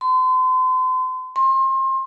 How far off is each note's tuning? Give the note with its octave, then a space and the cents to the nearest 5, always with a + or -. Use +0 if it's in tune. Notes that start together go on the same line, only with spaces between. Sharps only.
C6 -40
C6 +30